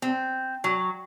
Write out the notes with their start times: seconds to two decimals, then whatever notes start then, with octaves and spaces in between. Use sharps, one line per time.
0.02 C4
0.64 F#3